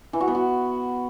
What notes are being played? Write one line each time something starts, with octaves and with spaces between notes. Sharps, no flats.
E3
F#4
B3
F#4